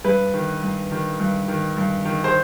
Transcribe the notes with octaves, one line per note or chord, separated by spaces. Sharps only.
G2 B4
D#3
G2
D#3
G2
D#3
G2
D#3
C5